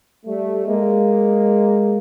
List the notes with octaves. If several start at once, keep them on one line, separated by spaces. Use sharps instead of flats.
G3 A3
G#3 A#3